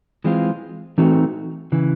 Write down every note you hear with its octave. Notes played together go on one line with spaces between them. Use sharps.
E3 G#3 C4 F4
E3 A3 C4 D#4 F#4
C#3 E3